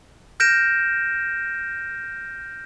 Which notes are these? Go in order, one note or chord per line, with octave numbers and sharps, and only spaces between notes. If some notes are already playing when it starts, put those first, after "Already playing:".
F6 G6 A#6 D7 E7